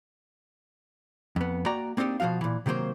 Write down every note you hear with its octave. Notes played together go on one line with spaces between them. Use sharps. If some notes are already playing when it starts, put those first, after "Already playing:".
F2 B3
A#3 F#4 D5 G5 A#5
A#3 C4 D4 D#4 G4
B2 F3 A3 F#4 F5
A#2 E3
C3 D#3 F#3 A#3 C5